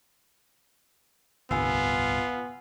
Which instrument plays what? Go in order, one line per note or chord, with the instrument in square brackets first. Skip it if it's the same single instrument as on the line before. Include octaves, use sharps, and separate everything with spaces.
[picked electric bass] D1 G1 C2 [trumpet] B3 [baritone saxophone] F4 [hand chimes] G#5 E6